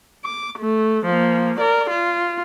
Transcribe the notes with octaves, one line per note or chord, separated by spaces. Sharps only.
D6
A3
F3 A#3
A#4 D5
F4